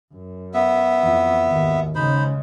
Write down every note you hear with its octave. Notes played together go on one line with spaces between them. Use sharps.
F#2
B3 E5
F2 E3
G#1 D#2
C#3 G#3 D#4 C5 B5